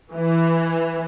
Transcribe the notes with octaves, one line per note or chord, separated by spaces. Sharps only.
E3